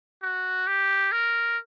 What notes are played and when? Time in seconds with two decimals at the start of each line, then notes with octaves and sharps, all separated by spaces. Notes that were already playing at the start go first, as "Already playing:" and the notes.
0.23 F#4
0.67 G4
1.12 A#4